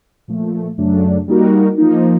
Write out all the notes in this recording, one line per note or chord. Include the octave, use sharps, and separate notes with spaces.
A#2 F3 A3
F#2 C#3 F#3 A3 D4
G3 A#3 D#4 F#4 A#4
F3 A#3 D#4